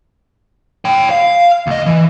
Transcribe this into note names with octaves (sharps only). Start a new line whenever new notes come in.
C#5 G5
F5
D2 D#5
E3